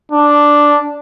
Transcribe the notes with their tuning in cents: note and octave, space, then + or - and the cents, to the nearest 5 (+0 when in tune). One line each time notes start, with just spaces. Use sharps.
D4 +0